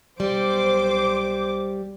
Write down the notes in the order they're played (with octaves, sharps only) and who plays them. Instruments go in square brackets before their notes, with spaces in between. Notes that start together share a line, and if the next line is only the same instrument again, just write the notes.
[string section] B1 C5 D6 [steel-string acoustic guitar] G3